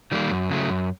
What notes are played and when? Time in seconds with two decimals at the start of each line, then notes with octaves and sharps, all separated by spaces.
0.12 D#3 G3 A#3
0.31 F#2
0.50 C#3 F#3 A3
0.69 F#2